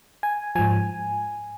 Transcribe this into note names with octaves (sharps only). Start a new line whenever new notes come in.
G#5
G#2 F3 G#5